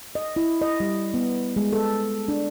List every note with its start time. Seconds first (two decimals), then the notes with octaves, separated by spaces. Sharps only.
0.15 D#5
0.36 E4
0.62 D#5
0.80 G3
1.14 B3
1.56 G#3
1.73 A4
2.28 D4